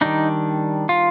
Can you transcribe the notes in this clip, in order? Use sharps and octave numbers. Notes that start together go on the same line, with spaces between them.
D#3 G3 D4 D#4
F4